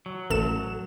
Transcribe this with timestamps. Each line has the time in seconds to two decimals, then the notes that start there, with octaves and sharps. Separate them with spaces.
0.06 F#3
0.30 A1 A4 E7